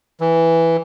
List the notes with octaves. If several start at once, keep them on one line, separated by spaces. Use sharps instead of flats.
E3